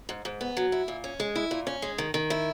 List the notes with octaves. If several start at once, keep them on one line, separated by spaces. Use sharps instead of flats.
G#2
G#2
B3
F#3
E4
A#2
C#4
G#3
E4
A#2
C#4
G#3
D#3
D#3
E4